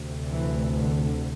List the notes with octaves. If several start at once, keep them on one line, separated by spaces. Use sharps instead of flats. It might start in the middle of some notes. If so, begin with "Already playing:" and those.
Already playing: D2 C3
E3
D3